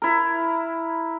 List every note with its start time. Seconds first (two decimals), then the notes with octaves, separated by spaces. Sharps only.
0.02 E4 A#4